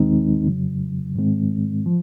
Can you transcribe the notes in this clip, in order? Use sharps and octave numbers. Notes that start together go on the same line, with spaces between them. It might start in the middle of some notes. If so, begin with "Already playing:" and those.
Already playing: D#2 D#3 G#3 C4 D#4
F2 C#3 F#3
G#2 D#3 G#3 C4
F3